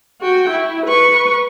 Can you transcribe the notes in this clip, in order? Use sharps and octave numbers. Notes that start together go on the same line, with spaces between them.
F#4 G5
E4
B4 C#6